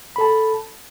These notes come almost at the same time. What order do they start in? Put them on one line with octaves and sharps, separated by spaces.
B5 A4 A5